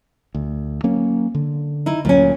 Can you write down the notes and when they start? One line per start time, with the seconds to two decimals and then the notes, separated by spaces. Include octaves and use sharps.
0.35 D2
0.84 F#3 A#3 C#4
1.35 D3
1.86 D#4 E4
2.05 D2 A#2 F#3 C#4